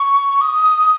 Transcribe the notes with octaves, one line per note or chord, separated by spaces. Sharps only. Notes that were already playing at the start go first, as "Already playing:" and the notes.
Already playing: C#6
D#6